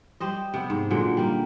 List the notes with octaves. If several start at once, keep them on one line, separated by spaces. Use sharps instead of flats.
G3 G4 C5 D#5
C3 B3
G#2
A#2 D3 F#3 G#3
G3 A#3